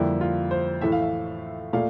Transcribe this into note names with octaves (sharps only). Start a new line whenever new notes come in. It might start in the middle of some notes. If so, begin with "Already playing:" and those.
Already playing: F2 D3 G3 A#3 E4
F4
C5
A2 E3 A3 E5
F5
E5
A#2 A3 F5